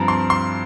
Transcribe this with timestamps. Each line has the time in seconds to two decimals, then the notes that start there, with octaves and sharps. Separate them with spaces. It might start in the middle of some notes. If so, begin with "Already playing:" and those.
Already playing: G2 F3 C4 A5 A#5
0.08 C6
0.30 C6